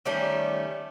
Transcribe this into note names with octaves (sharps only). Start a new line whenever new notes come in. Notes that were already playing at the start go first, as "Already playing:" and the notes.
D#3 G3 A3 C#4